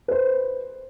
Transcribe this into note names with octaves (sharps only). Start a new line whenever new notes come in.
B4 C5